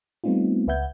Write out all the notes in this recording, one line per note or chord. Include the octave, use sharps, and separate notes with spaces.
G3 A3 B3 C4 D#4 F4
C#2 B4 E5 F#5 G6 G#6